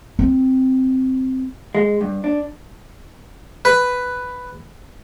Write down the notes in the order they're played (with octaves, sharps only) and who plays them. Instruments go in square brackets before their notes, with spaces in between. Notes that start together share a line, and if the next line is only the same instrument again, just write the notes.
[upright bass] C4
[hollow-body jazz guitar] G#3
G2
D4
[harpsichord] B4